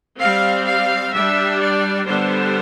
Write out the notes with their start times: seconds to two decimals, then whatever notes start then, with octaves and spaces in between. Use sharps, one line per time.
0.18 G3 C4 F5
0.65 F5
1.13 G3 D4 E5
1.60 D5
2.06 D3 G3 B3 D4 C5